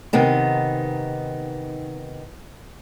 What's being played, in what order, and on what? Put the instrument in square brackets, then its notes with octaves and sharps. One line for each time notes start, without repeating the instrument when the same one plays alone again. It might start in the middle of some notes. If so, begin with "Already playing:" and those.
[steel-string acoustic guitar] C3 D#3 B3 D#4